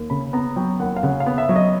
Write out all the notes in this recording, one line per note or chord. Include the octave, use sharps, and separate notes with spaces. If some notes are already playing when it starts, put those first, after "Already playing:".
Already playing: D#2
C#3 B5
B3 A#5
F#3 G5
D#2 F#5
F5
C#3 F#5
F5
B3
E5
F#3
D#5